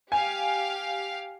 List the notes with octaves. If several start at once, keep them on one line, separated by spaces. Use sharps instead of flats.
G4 F5 G#5